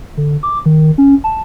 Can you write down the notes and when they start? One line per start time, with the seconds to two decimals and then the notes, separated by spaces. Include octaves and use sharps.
0.17 D3
0.43 D6
0.66 D#3
0.98 C#4
1.24 A5